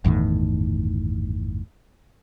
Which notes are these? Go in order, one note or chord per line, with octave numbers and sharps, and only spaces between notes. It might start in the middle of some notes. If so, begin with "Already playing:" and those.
G1 E2 A2 D#3